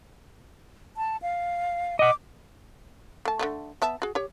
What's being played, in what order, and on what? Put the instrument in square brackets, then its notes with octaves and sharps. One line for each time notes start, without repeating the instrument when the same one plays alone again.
[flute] A5
F5
[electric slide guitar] D#5 F#5 [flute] D6
[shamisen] A3 A5
D3 D#3 A3
B3 E5 A5
F#4 G#4
G4 C#5